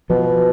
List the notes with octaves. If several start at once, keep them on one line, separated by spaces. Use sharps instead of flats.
B2 F3